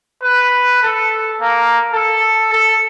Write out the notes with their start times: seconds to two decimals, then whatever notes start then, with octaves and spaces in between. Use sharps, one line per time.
0.23 B4
0.83 A4
1.41 A#3
1.93 A4
2.53 A4